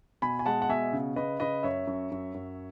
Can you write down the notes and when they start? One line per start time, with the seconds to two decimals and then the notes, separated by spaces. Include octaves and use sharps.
0.22 B2 G#5 B5
0.39 G#5
0.46 G#3 F#5 A5
0.62 F#5
0.69 B2 E5 G#5
0.93 C#3
1.16 C#3 B4 D#5
1.40 C#3 B4 D#5
1.63 F#2 C#5 E5
1.87 F#2
2.11 F#2
2.34 F#2